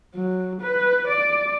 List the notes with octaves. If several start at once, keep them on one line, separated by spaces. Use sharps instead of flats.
F#3
B4
D5